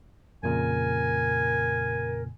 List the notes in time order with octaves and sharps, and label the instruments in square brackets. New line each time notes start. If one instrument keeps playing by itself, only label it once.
[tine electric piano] F2 A#2 C#3 [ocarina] A#4 [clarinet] G#5